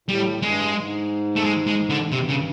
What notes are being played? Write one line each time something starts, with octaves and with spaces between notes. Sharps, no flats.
A2 G3
G2 G#3
G#2
A3
G#3
G#3
D3
G2 C3
C#3